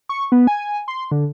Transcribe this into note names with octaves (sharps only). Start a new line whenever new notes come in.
C#6
B3
G#5
C6
D3